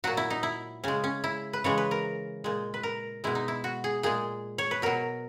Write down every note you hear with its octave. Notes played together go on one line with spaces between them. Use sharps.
A#2 F#3 F#4
E4
D#4
E4
C#3 G#3 C#4
C#4
E4
B4
C#3 E3 G#3 C#5
B4
A#4
A#2 G#3
B4
A#4
B2 G#3 E4
D#4
E4
F#4
G#4
A#2 G#3 G#4
C#5
B4
B2 F#3 A#4